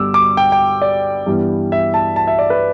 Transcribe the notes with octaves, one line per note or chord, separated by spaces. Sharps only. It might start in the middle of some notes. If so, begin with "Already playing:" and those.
Already playing: G2 D3 G3 B3 D6 E6
D6
G5
G5
D5
G2 E3 G3 B3
E5
A5
A5
E5
D5
B4